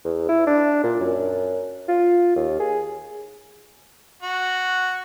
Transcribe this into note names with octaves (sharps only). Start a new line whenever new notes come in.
E2
E4
D4
A#2
F#2
F4
D#2
G#4
F#4